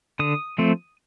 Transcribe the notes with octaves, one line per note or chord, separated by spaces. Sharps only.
D3 D#6
F3 A3 C4